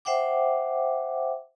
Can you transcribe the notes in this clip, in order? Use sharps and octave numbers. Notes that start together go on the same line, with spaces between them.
C5 E5 F#5 G5 D6